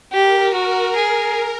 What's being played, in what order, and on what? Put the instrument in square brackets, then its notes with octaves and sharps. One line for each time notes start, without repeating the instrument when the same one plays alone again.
[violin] G4 [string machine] A#4
[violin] F#4
G#4